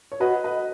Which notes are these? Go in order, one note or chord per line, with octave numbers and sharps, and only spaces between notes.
C#5
F#4 B4 D#5
B4 D#5